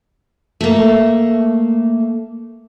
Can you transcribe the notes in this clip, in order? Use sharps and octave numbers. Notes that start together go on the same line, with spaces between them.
A3 A#3